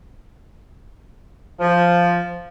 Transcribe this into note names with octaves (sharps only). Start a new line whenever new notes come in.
F3